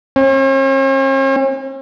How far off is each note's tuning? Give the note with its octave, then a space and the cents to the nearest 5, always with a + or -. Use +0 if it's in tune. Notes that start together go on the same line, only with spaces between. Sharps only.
C#4 -45